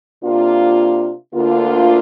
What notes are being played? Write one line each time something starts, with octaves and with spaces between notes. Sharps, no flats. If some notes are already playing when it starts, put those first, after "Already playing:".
C3 A#3 D4 F4
D2 D3 A#3 F4